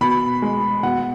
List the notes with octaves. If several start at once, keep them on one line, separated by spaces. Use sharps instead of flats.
B2 B5
G#3
B2 F#5